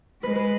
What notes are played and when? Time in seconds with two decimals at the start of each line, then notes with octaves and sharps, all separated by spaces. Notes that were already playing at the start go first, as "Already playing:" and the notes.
0.22 G#3 B4
0.36 B4